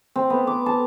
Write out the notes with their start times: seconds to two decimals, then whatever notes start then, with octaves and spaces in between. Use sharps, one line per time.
0.16 C4
0.30 B3
0.47 D6
0.66 A5